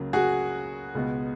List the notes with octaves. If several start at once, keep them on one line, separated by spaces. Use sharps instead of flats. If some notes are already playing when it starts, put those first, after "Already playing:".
Already playing: C#2 C#3 F#3 A#3
F#4 G#4
C#2 B2 G#3 B3